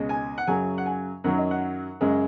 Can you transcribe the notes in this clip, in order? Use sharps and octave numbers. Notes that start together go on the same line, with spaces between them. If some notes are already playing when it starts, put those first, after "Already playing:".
Already playing: C#2 B2 G#3
G#5
F#5
F#2 C#3 F#3 G#5
F#5
G#5
F#2 D#3 F#3 F#5
D#5
F#5
F#2 C#3 G#3